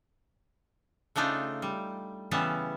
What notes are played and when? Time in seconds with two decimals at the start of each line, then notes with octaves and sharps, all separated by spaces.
1.16 C#3 A3 D4 D#4 F4
1.62 G3
2.31 C#3 E3 G3 B3 C#4 A5